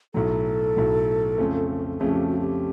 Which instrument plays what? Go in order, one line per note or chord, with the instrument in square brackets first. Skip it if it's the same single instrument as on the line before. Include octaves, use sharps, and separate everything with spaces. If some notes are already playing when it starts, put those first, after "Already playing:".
[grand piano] B1 A2 F#3 [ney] A4
[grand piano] B1 A2 F#3
F2 C#3 F3 A3 C#4
[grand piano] F2 C#3 F3 A3 C#4 [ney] G#4
[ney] G4
F#4
G4